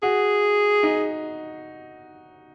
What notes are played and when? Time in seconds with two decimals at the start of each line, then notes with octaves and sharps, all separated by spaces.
0.03 F#4 G#4
0.83 D#4